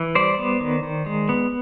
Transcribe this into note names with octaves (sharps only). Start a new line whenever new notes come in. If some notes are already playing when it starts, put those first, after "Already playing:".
Already playing: E3
G3 C5 D5
B3
D#3
D#3
G#3
B3